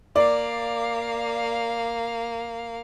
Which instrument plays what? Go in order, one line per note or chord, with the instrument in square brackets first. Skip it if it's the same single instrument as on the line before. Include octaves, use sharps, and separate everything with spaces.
[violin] A#3 F5 [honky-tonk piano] D5